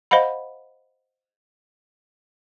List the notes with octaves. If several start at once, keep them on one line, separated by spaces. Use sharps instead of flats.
C5 D#5 F5 F#5 B5